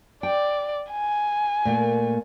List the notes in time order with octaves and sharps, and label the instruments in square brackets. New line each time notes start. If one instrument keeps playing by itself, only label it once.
[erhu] D5 [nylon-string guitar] G5
[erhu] G#5
[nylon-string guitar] A#2 A3 A#3